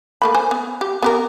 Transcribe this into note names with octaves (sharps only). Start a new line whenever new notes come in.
A3 A#3 B5
C5 G#5
B3
G4
B3 G4 A#4